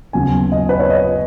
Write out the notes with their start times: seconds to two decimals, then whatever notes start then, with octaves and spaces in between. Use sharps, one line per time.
0.13 D#2 C#3 F#3 B3 G#5
0.52 D#5
0.69 B4
0.79 C#5
0.90 D#5